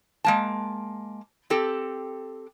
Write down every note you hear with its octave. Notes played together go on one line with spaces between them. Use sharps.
G#3 A#3 A5
C4 G4 A4